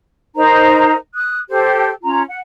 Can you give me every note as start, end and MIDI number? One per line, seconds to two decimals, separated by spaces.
0.35 0.94 63
0.35 0.94 70
0.35 0.94 72
0.35 0.94 82
1.14 1.40 87
1.14 1.40 90
1.48 1.89 67
1.48 1.89 69
1.48 1.89 72
2.02 2.21 61
2.02 2.21 65
2.02 2.21 82
2.28 2.37 78